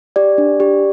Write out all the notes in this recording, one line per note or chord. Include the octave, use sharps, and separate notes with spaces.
G4 D5
D4
G4